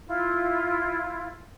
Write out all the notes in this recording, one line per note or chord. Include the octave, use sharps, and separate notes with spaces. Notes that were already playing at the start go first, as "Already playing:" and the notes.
E4 F4